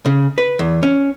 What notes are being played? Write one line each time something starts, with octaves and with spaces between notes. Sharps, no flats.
C#3
B4
E2
C#4